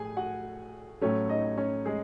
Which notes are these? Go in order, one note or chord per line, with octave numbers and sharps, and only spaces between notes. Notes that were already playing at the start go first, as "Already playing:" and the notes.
Already playing: A2 A3 G#4 G#5
F#4 F#5
A2 F#3 A3 C#4 C#5
D#4 D#5
C#4 C#5
G#3 G#4